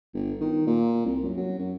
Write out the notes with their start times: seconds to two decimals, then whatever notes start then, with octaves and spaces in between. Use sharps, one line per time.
0.14 G1
0.41 D#3
0.67 A#2
1.05 C2
1.24 F#2
1.37 F#3
1.59 F#2